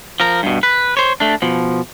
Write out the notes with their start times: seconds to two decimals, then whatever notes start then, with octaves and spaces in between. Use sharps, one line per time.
0.20 F3 A#4
0.43 G2 B2
0.63 B4
0.97 C5 C#5
1.20 A3 D4
1.42 B2 F3